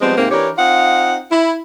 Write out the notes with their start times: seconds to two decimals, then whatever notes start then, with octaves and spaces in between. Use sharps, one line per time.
0.01 F3 G3 G#3 B3 C4
0.17 G#2 C3 A#3 C4
0.31 E3 D4 G4 A#4 C#5
0.58 C4 D#4 F4 F5 F#5
1.32 E4